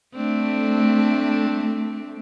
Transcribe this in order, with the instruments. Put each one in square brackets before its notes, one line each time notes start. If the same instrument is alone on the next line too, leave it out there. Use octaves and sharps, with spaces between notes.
[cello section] A3 [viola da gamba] C4 D4